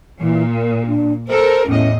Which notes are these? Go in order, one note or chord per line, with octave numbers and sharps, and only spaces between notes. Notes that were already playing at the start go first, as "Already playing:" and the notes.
A#2 E3
A#4
D4
A4 A#4 C5
E2 A2 C#4 D#5